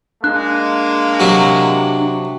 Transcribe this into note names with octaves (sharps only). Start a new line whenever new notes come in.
G#3 A#3 D4 F#6
C3 F#3 F#4